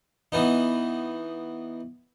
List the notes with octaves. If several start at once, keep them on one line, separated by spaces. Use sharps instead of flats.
E3 B3 D#4